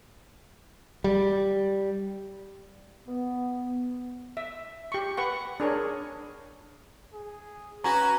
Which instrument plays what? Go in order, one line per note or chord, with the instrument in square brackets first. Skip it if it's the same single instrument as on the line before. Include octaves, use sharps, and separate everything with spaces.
[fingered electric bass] G3
[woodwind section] B3
[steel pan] E5
G4 C#6
B4 F#5 C#6
D4 G#4 A#4 C#5
[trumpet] G#4
[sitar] C#4 F#4 [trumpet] B4 [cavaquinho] G#5 [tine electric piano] A#5